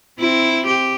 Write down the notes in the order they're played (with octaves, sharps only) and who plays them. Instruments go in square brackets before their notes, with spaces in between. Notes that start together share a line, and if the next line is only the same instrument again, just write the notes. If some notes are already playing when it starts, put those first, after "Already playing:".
[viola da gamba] C4 E4
G4